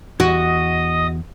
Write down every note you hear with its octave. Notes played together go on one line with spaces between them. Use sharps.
E2 F#4 D#5 D#6